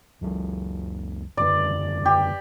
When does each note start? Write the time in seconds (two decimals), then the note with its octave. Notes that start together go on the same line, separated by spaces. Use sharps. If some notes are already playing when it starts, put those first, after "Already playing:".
0.21 F#1 C#2 F#3
1.37 E1 F#2 D3 D5
2.05 G4